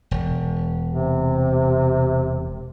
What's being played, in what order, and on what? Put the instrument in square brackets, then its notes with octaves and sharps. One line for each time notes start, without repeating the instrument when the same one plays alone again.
[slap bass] E1
[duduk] C3